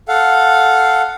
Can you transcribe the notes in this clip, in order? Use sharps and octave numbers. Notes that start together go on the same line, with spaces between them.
A4 F5 F#5